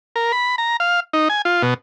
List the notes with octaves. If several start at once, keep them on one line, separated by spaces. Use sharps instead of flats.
A#4
B5
A#5
F5
D#4
G#5
F4
B2